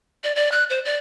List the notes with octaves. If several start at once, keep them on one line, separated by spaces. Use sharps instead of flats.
D5
D5
F#6
C5
D5